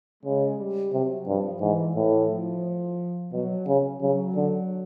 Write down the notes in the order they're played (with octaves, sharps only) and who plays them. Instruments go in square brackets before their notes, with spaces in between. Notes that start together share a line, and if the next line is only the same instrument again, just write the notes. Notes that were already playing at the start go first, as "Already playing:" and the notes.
[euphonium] C#3 [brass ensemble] G#3
[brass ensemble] G3
[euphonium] C3 [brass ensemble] F#3
[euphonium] G2 [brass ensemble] F3
[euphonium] G#2 [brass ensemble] E3
[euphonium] A2 [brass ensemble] E3
[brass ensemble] F3
[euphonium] B2 [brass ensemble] F#3
[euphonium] C#3
[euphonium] C#3 [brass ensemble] F#3
[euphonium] D3